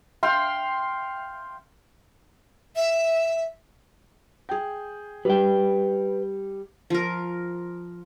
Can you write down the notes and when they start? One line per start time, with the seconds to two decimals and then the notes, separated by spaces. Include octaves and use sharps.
0.23 F5 G5 C6
2.76 E5
4.49 G#4 G5
5.25 G3 B4 G5
6.90 F3 A#4